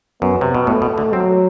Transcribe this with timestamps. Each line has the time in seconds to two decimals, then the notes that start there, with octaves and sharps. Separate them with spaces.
0.21 F#2 B3
0.41 C3
0.55 B2
0.67 A2 A3
0.82 B2
0.98 D3
1.13 F#3 C4